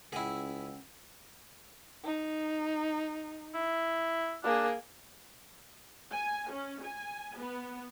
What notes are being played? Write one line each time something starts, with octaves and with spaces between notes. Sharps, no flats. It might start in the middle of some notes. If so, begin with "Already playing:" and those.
C#2 C#4 E4 G#4 F#5 G5 E6
D#4
E4
A#3 D4 G#4
G#5
C#4
G#5
B3